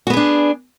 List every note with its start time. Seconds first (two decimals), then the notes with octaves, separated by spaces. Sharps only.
0.07 F#4
0.10 B3
0.13 G#4
0.17 D4